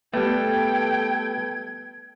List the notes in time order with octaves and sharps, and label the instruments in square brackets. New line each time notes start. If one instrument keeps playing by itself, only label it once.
[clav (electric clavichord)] G3 A3 [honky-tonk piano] B3 [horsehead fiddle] A4 G5 [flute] G#6